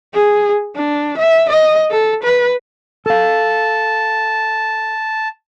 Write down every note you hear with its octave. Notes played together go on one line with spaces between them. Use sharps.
G#4
D4
E5
D#5
A4
B4
A4 F5 A5